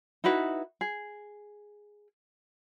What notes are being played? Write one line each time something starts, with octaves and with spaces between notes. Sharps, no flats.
D#4 E4 F#4 B4
G#4